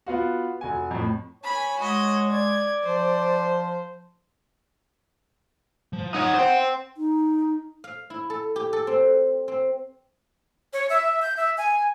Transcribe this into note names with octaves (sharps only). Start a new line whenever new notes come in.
B3 F4 F#4
F1 F#4 G#5
F2 A2
C#5 G#5 B5
G#3 F#4 D#5
D5 G#6
F3 C5
F3
D#4 C#5 F#5
C5 G5
D#4
F5
E4
A4
G4
A4
C4
C4
C#5
E5
G6
E5
G#5